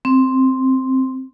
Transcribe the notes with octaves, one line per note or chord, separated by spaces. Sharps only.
C4